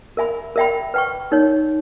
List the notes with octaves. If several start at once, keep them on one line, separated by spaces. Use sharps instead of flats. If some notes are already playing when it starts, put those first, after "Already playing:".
A#4 E5 G#5 B5
A#4 E5 G5 B5
B4 G5 C#6
D#4 A#4 C#5